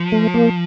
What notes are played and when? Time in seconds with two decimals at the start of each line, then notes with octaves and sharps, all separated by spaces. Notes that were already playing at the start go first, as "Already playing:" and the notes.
Already playing: F3
0.12 A3
0.34 A#3